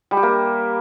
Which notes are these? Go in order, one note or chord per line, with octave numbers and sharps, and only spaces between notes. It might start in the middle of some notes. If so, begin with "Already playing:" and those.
G3
G4
A#3